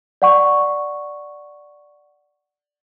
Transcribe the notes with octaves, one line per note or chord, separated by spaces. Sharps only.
D5 F#5 C#6